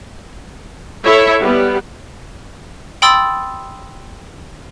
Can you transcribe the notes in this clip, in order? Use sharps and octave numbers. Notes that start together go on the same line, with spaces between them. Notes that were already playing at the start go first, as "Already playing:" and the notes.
E4 A4 C#5 E5
G3 B3
G5 B5 C6 D#6 E6 A6